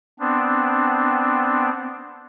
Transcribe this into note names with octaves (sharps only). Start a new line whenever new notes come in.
B3 C4 D4